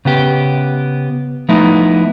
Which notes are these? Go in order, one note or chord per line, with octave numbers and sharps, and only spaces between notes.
C#3 B3 G4
F3 A3 B3 D#4 E4